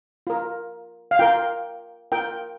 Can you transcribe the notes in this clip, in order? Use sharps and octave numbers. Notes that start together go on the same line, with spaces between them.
F4 A#4
F5
F4 A#4 G5
F4 A#4 G5